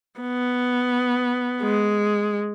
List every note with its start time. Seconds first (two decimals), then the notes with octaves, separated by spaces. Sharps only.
0.20 B3
1.62 G#3